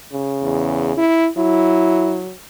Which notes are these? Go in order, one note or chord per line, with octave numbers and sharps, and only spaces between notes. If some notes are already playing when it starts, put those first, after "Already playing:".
C#3
E2
E4
F#3 E4